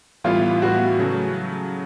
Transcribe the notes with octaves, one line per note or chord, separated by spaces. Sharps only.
A2 E3 G3 B3 E4 F4
A2 E3 G3 B3 E4 F#4
C#3 F#3 A3